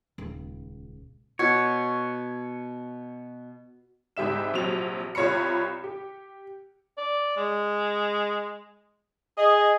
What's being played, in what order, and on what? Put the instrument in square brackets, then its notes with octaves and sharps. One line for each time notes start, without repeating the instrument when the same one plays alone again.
[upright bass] D#1 C#2
[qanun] B2 [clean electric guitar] C#5
[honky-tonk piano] C2 G#2 G4 E5 E7
A#1 C3 F#3 F7
C2 F4 C#5 A#5 B5 C#7
G4
[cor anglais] D5
G#3
[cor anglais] G#4 [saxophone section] D#5